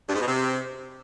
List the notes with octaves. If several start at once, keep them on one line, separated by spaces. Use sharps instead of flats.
G2
G#2
B2
C3